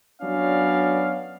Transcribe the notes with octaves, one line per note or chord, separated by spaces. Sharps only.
F#3 B3 C#4 D4 D5 F5